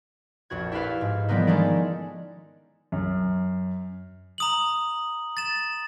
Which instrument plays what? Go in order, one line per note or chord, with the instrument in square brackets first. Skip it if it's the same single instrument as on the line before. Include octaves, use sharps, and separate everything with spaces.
[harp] A#1 F2 F#4 G#6
E4 G4 A4 B4 F5
G#2
E3 F3 G3 A#3 B3 D#4
D#3 G#3 C#4 D4 A4 D5
[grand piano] F#2
[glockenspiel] A#5 D#6 F#7
A6 E7